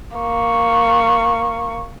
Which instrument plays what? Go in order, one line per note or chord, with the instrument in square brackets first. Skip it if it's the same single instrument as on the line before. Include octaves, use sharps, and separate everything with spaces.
[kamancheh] A#3 C#6